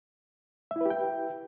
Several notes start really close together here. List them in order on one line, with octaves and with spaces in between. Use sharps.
E5 E4 B4 G4 G5